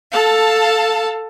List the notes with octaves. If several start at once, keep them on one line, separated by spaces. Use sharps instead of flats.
A4 F5 A5